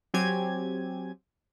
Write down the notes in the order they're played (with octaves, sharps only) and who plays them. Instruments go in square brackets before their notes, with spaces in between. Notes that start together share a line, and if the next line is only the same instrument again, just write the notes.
[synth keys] F#3 C4 G4 G#5 G#6